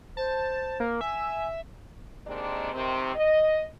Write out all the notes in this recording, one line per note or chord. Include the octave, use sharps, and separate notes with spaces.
C5 A5
A#3
E5 G#5
C3 D#3 G#3 A#3 C4 D4
C3 D#3 C4
D#5